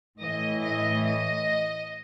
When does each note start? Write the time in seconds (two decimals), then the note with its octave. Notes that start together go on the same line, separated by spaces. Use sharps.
0.21 A2 E3 D#5
0.63 D#5
1.04 D#5